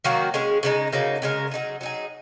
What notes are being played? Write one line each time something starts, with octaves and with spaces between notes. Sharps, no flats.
D#3 F#3 A#3 F#4
G#3 C#4 G#4
C#3 G#3 D#4
C#3 F#3 A#3 D#4
C#3 G#3 D#4 A#4
F#3 D#4 G#4
F#3 D#4 G#4